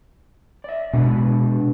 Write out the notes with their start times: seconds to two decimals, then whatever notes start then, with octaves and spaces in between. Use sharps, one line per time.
0.64 D5 E5
0.93 B2 G#3 D4 B4